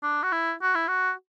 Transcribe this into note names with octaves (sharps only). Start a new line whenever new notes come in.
D4
F#4
E4
F#4
E4
F#4